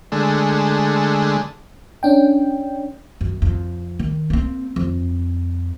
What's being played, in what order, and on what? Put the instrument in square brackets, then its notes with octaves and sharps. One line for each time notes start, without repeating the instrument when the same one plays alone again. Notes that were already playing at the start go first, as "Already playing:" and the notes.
[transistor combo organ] D3 G#3 A3
[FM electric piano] C#4 D4 G5
[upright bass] F#2
F2
D#3
A#3 C4
F2